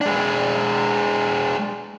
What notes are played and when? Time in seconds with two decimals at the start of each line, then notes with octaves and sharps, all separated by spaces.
0.01 G#3 D4